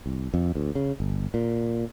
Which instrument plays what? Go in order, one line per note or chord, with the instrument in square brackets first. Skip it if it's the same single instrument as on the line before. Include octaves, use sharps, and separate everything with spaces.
[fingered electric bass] C2
F2
D2
C#3
G1
A#2